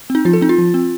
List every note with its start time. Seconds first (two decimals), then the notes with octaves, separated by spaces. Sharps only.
0.10 C4
0.15 D#4
0.25 F3 F4
0.33 A4
0.41 C4 D#4
0.49 F4
0.58 F3
0.74 C4